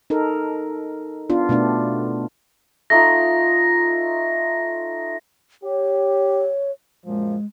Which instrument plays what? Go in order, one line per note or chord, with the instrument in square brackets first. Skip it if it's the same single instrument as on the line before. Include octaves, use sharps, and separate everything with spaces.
[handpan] D#4 A4 A#4
B3 D4 F4
B2 A3 B3 D4
[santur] A3 D#4 F4 [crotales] A#6
[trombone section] G4 [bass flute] C#5
[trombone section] F#2 A#2 F3 [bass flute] G#3